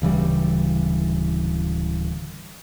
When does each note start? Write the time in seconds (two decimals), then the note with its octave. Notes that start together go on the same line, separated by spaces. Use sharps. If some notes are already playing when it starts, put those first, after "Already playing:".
0.02 D1 C#3 E3 G3